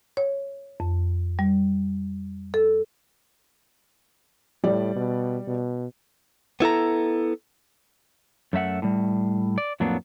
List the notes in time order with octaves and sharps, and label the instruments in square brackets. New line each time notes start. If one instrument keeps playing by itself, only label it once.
[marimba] C#5
F2
G3
A4
[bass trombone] A2 [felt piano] G3 D5
[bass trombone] B2
B2
[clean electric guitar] B3 E4 A4 A#5
[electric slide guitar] F#2 A3 E5 F#5
A2 G3
D5
F2 A2 F#3 A#3 B3 D4